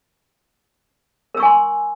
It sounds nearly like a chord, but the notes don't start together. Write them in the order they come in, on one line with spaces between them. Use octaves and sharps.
A#4 E6 C#6 G#5 C6